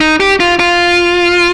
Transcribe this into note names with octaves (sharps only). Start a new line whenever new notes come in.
D#4
G4
F4
F4